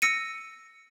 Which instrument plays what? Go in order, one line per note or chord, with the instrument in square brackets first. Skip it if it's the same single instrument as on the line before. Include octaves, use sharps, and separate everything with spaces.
[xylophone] E6 A#6 C#7 D#7